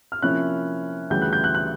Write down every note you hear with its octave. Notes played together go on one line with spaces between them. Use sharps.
F6
C3 F3 A#3 C#4 E4 F#6
D2 C#3 E3 G3 G6
F#6
G6
F#6
F#6